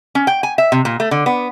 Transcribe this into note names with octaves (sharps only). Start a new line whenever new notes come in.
C#4
G5
G#5
E5
C3
A#2
A3
D3
B3